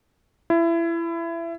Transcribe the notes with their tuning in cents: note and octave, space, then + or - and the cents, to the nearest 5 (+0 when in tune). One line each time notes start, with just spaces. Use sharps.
E4 +25